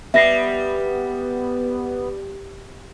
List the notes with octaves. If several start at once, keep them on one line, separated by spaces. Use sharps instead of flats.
G3 B3 E5 A#6 C7